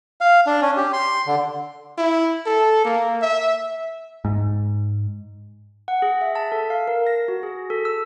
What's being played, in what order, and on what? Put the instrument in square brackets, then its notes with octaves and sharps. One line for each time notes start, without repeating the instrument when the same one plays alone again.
[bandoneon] F5
D4
C#4
G4
C6
D3
[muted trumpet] E4
A4
A#3
E5
[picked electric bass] G#2
[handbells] F#5
G#4
E5
A5
A4
F5
A#4
A#6
F#4
G#4
A4
E6